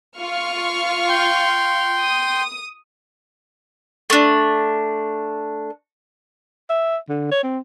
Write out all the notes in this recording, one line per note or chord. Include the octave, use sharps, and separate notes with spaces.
F4 C#6 F6
G5 C6
D#6
A3 D4
E5
D3
C#5
C4